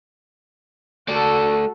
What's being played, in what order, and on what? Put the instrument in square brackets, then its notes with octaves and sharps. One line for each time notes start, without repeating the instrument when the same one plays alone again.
[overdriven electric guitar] A3 D5 [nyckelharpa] F#4 A4